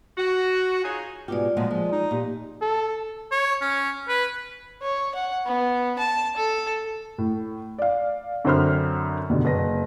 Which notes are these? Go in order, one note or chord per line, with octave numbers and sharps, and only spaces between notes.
F#4
D#4 F4 G#4 C#5 G#5
G#2 B2 F4 G4 D5
A#2 F3 F#3 G#3
F3 G#3
D#4
A#2 G4
A4
C#5
C#4
B4
C#5
F#5
B3
A5
A4
A2
D5 F5
F#2 D3 C4 C5 B5 F6
F#1 D#2 B2 D3
F#1 B4 A#6